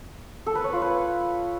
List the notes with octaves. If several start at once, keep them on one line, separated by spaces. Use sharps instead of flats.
A4
B4
C#5
F4
B4